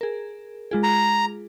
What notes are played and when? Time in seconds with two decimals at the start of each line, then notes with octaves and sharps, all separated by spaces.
0.01 G#4 A#4
0.71 G#3 F4 G#4
0.83 A#5